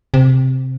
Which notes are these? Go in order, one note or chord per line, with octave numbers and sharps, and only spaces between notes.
C3